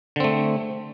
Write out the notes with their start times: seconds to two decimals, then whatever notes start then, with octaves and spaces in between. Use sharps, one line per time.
0.16 D3
0.20 C4
0.24 A3